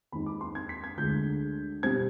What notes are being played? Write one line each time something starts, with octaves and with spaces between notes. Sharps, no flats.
D#2 D#3 G#3 C4 D#4 B5
D6
C6
G#6
B6
G#6
D2 D3 G#3 G6
B2 G3 C4 G#6